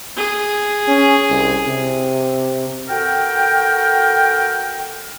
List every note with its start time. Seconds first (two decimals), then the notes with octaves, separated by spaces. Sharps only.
0.17 G#4
0.88 C#4
1.30 C2
1.68 C3
2.89 F#4 A4 A#4 G5